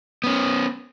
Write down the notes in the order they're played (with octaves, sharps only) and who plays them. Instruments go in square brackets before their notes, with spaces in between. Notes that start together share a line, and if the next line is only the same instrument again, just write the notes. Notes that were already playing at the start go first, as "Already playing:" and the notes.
[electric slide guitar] B3 C#4